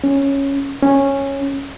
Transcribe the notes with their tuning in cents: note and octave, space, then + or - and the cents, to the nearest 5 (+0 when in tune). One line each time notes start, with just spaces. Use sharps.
C#4 -5
C#4 -10